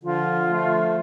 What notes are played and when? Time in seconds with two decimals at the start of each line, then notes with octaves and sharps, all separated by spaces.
0.03 D3 F3 F4
0.49 F3 A3